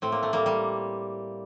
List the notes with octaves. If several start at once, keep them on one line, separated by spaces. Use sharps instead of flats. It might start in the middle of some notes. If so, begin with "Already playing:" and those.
A2 C4
A#3
A3
G3 A#3
G3